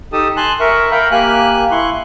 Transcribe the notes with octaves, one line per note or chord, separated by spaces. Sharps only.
D#4 G4 A4 A5 D#6
G#5 A5 C6 F#6
A#4 E5 C#6
A#4 F5 G5 A#5 B5
A#3 G4 G#5 F#6
E4 C6 C#6 F#6